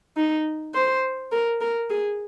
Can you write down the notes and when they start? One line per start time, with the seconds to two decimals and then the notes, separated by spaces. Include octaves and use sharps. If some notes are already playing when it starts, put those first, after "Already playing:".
0.17 D#4
0.75 C5
1.32 A#4
1.61 A#4
1.90 G#4